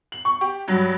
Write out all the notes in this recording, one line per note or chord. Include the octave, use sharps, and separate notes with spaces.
F#7
C#6
G4
G2 F#3